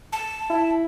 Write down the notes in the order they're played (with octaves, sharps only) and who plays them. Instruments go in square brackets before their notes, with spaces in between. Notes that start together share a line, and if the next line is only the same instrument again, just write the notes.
[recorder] A5
[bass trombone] E4